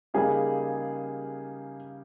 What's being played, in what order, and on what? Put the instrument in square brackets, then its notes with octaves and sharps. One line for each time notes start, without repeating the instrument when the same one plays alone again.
[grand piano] C#3 G3 A#3 D#4 [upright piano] G#4